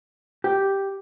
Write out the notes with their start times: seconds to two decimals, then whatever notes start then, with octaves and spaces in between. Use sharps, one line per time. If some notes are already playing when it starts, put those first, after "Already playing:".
0.44 G4